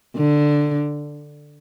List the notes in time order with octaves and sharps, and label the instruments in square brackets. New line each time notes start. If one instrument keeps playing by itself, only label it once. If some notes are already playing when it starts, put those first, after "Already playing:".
[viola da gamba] D3